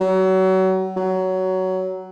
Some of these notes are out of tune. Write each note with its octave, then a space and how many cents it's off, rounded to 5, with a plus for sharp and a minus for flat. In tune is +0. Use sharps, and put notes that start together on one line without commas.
F#3 +30
F#3 +15